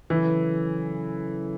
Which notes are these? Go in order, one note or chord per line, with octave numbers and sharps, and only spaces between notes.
C#3 E3 F#3 C#4 E4 A4